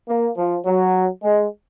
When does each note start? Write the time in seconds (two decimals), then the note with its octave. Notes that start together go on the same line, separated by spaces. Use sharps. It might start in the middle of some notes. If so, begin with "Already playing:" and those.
0.09 A#3
0.38 F3
0.66 F#3
1.23 G#3